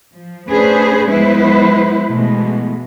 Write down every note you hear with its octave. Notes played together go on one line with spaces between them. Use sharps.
F3
A3 C#4 D4 G#4 B4 C5
F3 G#3 B3 E4 B4 C5
B2 E3 G#3 A3